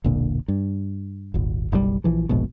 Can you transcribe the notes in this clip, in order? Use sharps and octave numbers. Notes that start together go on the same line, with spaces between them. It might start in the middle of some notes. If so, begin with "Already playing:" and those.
E1 B1 A#2 D3
G2
D#1 G#1
F#1 B1 C#3 G3
A#1 E3 F3
D#1 A#1 G#2 B2